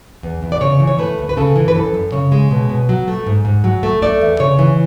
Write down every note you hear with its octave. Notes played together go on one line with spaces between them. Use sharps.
E2
E2
D5
C#3 C#5
E3
C#5
A3 B4
D2
B4
C#3 A4
E3
B4
F#2 A4
F#2
C#3 C#5
G#3
B2
B2
F#3
A3
G#2
G#2
F#3
A3
A3 D5
E2
C#3 C#5
E3